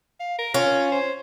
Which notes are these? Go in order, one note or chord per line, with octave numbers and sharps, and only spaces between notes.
F5
A#4
C#4 F4
C5